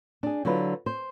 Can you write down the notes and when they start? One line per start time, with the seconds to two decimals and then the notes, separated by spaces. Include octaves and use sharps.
0.23 D4 G#4
0.45 D3 F#3 E4 F4 B4
0.86 C5